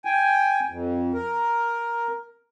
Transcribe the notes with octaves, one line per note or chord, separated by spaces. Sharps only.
G5 G#5
F2
A#4